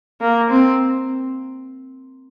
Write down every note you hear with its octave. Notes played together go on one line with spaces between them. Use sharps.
A#3
C4